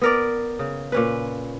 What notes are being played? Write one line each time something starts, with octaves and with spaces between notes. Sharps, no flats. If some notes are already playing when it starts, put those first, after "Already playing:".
B3 A#4 D5
C#3
A#2 C#4 B4